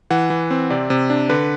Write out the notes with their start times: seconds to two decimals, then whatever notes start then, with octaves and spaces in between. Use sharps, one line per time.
0.10 E3 F#5
0.30 E3
0.51 C4
0.70 C3 D5
0.90 C3
1.10 D4
1.29 D3 B4